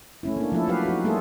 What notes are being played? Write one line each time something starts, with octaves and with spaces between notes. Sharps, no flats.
A3 C#4 E4
A#3 D4
F3 A3 E4 A4
F#3 F#4 G4 B4 F5
D#4 F#4
G3 A3 A#3 F4 G#4 A4